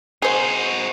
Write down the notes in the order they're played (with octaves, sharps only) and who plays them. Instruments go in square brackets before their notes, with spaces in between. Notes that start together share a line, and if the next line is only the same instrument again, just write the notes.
[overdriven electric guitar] D#4 F#4 [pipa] G#4 C5